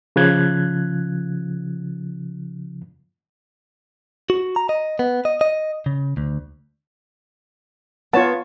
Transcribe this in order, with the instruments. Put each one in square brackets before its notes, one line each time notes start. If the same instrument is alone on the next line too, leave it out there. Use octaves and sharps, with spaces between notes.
[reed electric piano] C#3 F3 F#6 G#6
[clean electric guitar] F#4
A#5
D#5
B3
D#5
D#5
C#3
D2
[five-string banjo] B3 [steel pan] F4 C#5 A5